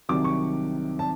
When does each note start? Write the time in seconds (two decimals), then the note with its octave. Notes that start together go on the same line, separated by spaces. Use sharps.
0.09 C2 C3 D#3 F#3 D6
0.24 C#6
0.99 A5